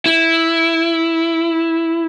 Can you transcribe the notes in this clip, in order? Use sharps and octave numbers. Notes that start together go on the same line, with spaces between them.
E4